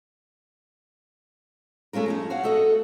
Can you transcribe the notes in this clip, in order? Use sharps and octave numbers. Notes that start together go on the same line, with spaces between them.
G#3 A3 C#4 F4 A#4
F3 C#4 D#4
F#4 C#5 F5 F#5
A3 F#4 A4 D#5 F#5